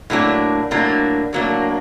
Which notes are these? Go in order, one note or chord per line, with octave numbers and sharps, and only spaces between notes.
A2 F#3 A#3 D4
A2 F#3 A#3 D4
A2 F#3 A#3 D4